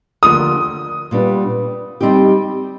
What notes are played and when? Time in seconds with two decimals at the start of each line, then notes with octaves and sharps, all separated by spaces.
0.23 D#2 D3 F3 A3 D4 D#6
1.11 A#2 G3 B3 D4
2.01 G3 C4 D#4 G4